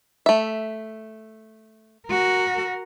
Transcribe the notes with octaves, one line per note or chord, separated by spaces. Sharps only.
A3 E5
F#4 A#4